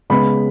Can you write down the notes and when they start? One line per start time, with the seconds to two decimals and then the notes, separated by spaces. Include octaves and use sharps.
0.10 C#3 G#3 B3 B5